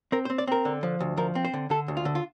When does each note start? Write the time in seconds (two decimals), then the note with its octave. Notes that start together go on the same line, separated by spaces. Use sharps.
0.12 C4 A#4
0.25 C5
0.30 C4
0.38 D5
0.47 C4 A#4
0.65 D3
0.83 F3
1.00 D2
1.17 F3 A#4
1.35 C4
1.45 C5
1.54 D3
1.70 D3 A4
1.88 D2
1.97 F4
2.05 D3
2.15 F4